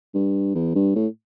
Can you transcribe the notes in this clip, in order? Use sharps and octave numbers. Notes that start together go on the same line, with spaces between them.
G2
E2
G2
A2